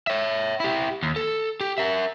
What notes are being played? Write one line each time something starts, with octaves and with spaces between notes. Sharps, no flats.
C#5 E5
E4 G4
D#2
A4
G4
A#4 E5